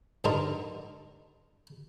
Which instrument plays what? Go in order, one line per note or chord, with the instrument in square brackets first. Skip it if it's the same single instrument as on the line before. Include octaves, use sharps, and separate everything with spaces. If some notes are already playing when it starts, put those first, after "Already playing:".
[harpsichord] G2 D3 D4 D#4 A#4 C6